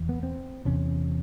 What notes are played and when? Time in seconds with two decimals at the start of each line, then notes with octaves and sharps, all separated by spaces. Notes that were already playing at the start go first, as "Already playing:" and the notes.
Already playing: E2
0.09 B3
0.23 C4
0.65 E2 C3 C#4